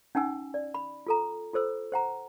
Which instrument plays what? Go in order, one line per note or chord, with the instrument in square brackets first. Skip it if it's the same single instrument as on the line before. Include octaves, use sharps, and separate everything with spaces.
[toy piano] C#4 D#4 F#5 G#5 E6
D5
B5
F4 A4 A#5
F4 A4 C5 E6
C5 F#5 A#5